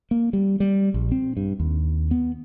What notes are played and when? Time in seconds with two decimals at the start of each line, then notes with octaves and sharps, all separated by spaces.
0.11 A#3
0.33 G3
0.60 G3
0.94 A#1
1.12 C4
1.37 G2
1.60 D#2
2.11 B3